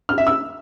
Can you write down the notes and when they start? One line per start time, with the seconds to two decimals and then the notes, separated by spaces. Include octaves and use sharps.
0.09 F6
0.18 E5
0.27 E6